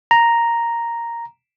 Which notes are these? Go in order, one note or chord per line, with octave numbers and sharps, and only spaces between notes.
A#5